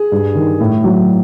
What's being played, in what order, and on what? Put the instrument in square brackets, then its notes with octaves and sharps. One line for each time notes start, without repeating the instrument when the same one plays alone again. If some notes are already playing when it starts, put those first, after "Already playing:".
Already playing: [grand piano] G#4
G2
D#3
A2
F#3